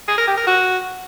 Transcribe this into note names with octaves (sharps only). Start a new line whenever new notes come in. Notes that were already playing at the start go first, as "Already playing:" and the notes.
G#4
A#4
G4
A#4
F#4